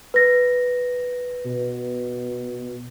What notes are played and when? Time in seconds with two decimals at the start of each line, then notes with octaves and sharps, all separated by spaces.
0.14 B4 A#6
1.45 B2